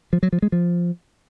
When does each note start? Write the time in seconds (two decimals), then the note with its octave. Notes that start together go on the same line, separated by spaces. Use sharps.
0.13 F3
0.23 F#3
0.33 F3
0.42 G#3
0.52 F3